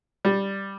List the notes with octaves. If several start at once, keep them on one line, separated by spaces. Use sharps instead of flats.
G3